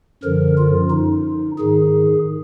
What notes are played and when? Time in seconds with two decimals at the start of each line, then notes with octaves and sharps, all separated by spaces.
0.23 F#2 D3 F3 A#4
0.58 F4
0.91 D#4
1.58 G#2 D#3 G#4